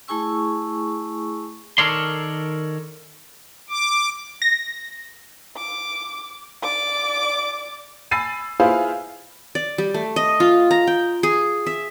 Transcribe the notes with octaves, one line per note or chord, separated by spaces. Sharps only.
A3 E4 G#4 G#5 C#6 E6
D#3 A4 A#4 C#5 D5 C6
D6
A#6
D6
D5 D6
G#5 B5 E6 A6 C7 D#7
E4 F4 G#4 B4 C5 F5
D5
G3
A3
D#5
F4
A#5
G5
G#4
E5